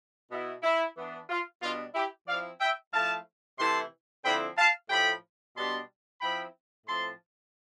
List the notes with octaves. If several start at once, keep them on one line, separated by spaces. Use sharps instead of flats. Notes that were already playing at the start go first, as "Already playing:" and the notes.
B2 B3 E4
E4
E3 B3 D4
F4
B2 G3 B3 D4 F4
E4 G4
F3 C4 E4 D5 F5
E5 G5
F3 A3 E4 F5 A5
C3 E3 A3 E4 A5 C6
D3 F3 C4 E4 G5 B5
F5 A5
A2 F3 A3 G5 B5
B2 G3 B3 D4 A5 C6
F3 C4 E4 G5 B5
A2 F3 C4 A5 C6